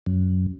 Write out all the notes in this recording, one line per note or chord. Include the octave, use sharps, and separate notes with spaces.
F#2